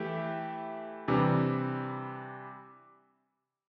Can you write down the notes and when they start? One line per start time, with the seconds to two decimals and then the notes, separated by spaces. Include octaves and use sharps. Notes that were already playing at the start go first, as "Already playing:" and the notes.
Already playing: E3 A3 E4 G4
1.08 C3 E3 G3 D4